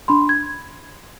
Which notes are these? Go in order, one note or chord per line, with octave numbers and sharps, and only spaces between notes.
D4 B5 C6
G#6